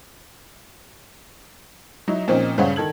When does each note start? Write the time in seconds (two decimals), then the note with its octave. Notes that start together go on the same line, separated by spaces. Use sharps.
2.08 F#3 D#4 E4
2.28 A#2 F3 C4 C#4 D#4
2.58 G2 C#3 C5 C#5 F5 F#5
2.76 D#3 A4 G#6 F#7